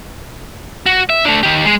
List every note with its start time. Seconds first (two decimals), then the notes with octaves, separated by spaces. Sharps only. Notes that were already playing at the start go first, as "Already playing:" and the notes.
0.86 F#4
1.10 E5
1.25 A3 D4
1.43 D#3 G4
1.65 G#3